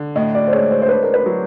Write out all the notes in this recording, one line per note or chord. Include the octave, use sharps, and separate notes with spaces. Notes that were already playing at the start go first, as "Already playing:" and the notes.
Already playing: D3
A2 D#5
D5
C5
G#3 C#5
C5
C5
D4 B4
A#4
B4
F#3